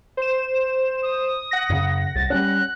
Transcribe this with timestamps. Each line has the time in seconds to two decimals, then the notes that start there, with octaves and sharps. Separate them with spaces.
0.17 C5 E7
1.03 D#6
1.51 F#5 A#6
1.70 F#2 C#3
2.15 C2 A6
2.30 G3 A3 C#4 F#6